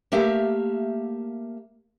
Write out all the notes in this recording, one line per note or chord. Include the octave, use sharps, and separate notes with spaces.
A3 A#3 G4 E5 F5